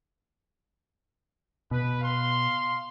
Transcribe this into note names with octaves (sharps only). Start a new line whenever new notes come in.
B2 B4
F5 C6